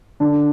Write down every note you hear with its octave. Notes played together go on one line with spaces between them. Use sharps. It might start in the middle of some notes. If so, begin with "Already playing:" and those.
D3 D4